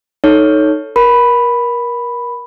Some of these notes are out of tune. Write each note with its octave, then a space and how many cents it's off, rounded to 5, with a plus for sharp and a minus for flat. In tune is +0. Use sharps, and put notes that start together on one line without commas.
D#4 +0 A4 +0 C#5 +0
A#4 +25 B5 +0